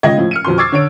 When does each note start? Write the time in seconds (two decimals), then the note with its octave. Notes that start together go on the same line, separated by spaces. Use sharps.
0.03 C#3 G#3 F4 D#5 G5 G#6
0.18 A2 F3
0.31 F6 C#7 D#7
0.44 F2 B2 C6
0.58 C#6 D6 E6 G#6 A6 C7
0.72 D3 C#5 D7